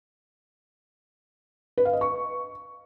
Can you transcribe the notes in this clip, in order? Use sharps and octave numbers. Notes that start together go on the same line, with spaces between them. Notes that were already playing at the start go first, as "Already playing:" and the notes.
B4
F5
D#5
C#6